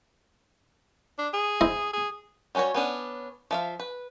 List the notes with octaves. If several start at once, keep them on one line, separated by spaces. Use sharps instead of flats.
D4
G#4
E4 C5 D#5
G#4
G3 C#4 D4 F#4 C#5
B3 C#4 D4
F3 E5 F5
B4